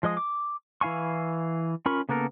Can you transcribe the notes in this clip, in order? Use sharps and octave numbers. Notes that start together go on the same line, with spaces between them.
F3 G#3 D#5 D#6
D6
E3 E4 F5 G#5 C#6
C#4 F4 A#4 B5 C#6
C#3 A#3 B3 A4 A#4